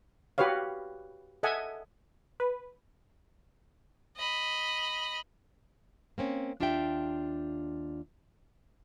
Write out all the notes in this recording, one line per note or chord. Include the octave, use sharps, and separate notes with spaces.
F#4 G4 B4 C#5 F5
A4 D#5 E5 F#5 G#5
B4
D#5 B5
A#3 C4 C#4
D#2 D4 F4 G4 E5 G5